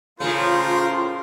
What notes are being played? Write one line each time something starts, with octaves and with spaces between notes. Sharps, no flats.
A2 C#3 A3 F4 A#4 C5